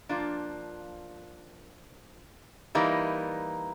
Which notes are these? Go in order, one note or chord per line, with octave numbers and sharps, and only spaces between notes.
F3 A#3 D4 F4
E3 G3 A#3 D#4